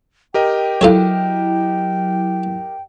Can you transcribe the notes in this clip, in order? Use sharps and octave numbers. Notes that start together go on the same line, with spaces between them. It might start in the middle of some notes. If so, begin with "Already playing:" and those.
G4 A#4 D#5 G5
F#3 E4 F4 A4 C#5